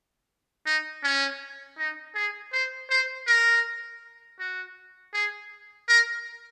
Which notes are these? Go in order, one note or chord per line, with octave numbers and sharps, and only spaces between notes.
D#4
C#4
D#4
G#4
C5
C5
A#4
F#4
G#4
A#4